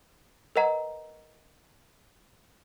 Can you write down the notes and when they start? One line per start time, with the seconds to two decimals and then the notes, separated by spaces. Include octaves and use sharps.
0.56 A#4 B4 D#5 F#5 A#5